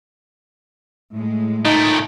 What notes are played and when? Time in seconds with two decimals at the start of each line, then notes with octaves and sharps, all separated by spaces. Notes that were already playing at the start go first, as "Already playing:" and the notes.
1.15 A2 G#3
1.65 A#2 A3 D#4